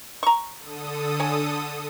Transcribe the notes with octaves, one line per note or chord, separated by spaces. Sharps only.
A#5 C#6
D3 A4 D#6
C#5 G#5